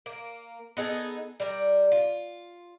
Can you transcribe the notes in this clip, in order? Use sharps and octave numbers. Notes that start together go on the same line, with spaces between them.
A#3
B3 D#4 G#4 A4
G3 A#4
F4